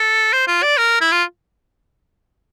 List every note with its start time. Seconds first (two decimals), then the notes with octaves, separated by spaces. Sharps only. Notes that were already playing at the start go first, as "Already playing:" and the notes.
Already playing: A4
0.33 C5
0.48 F4
0.63 D5
0.77 A#4
1.01 E4
1.12 F4